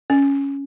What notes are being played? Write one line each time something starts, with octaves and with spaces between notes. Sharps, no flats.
C#4